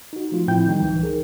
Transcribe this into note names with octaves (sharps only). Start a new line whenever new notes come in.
D#4 F#4
F3 A3 F4
A2 F3 C4 E4 G5 G6
D#3 G3 D#4
C#2 E3
D#4 G#4 A#4